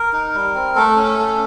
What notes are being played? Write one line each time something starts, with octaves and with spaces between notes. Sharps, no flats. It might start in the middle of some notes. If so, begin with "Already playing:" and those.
Already playing: A#4
D#4
G3
C4
A3 A4
C#4
A3